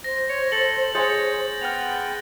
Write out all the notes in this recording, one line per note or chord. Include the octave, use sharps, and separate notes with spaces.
C5 A#6
C#5
A4 F#7
G#3 C#5 G#5 G6 A6
B3 G5 F6 F7